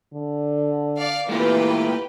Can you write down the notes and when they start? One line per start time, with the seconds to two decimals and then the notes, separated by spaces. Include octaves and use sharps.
0.14 D3
0.99 D5 F5
1.29 E3 A3 A#3 F4 G4 B4